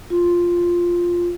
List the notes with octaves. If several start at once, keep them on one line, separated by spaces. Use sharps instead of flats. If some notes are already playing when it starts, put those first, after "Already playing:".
F4